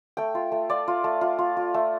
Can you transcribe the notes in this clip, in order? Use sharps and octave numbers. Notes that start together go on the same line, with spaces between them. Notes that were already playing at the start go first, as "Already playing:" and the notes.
A3 G5
F4
A3
F4 D5
F4
A3
F4
F4
F4
A3